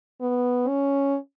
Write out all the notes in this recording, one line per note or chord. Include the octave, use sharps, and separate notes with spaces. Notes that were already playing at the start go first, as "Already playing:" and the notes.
B3
C#4